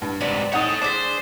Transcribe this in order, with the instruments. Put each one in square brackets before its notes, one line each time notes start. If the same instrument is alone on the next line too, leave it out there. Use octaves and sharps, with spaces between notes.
[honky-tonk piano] G2
[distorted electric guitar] G#2 C3 [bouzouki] D4 B4 D5
[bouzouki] C4 G#4 [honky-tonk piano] D#4 F#5 D#6 [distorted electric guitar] A4 C#5
[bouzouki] G#3 D4 [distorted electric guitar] C5 [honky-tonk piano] D6 A6 B6